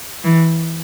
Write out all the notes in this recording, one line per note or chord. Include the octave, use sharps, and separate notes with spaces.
E3